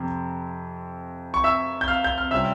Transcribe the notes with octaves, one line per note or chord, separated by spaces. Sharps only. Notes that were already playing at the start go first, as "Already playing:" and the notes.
Already playing: F2 C3 C4
C#6
E5 E6
G6
F5 F6
G6
F6
C3 G3 C#4 F4 E5 E6